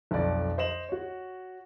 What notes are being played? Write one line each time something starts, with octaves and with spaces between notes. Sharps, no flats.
B1 F2 D5
C5 D#5 E7 F#7
F#4 C#5